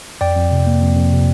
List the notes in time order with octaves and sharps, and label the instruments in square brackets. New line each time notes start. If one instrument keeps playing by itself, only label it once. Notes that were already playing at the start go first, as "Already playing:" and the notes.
[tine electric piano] F2 D5 G5
F2
C3
A#3
F2
F2
C3